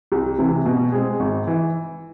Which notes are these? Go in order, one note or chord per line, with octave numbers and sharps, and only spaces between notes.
C2
C3 E3
B2
G#3 C4 G#4
G#1
E3